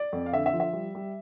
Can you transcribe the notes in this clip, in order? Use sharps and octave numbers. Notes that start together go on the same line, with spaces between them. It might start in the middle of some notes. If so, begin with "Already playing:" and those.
Already playing: D5
F2
F5
D3 E5
E5
F3
E5
G3
G3